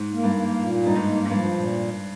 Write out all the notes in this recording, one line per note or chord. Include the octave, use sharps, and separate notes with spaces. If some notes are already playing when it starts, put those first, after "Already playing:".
Already playing: G#2
A#3
G2
A#3
A#2
G2 D#4
G#2
A#3
G#2
G2 F3
A#2